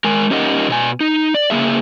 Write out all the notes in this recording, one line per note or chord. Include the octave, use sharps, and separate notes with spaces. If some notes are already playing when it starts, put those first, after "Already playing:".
G#3 A#4 G#5
C#4 D#4 G4 A#4 D#5 F#5
B2 A#4 G#5
D#4
D5
C#3 F#3 A#3 G#4 E5